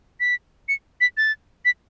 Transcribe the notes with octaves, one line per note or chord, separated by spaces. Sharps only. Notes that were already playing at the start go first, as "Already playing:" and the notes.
B6
C#7
B6
A6
B6